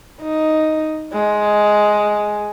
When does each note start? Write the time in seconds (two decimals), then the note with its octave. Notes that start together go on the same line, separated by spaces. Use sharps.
0.21 D#4
1.13 G#3